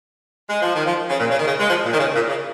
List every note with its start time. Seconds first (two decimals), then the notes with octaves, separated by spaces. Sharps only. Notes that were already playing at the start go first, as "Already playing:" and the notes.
0.49 G#3
0.62 F3
0.74 D#3
0.86 F3
1.09 C#3
1.19 A#2
1.30 C#3
1.39 D#3
1.47 C#3
1.59 G#3
1.69 F3
1.84 A#2
1.93 D#3
1.99 C#3
2.15 A#2
2.29 C#3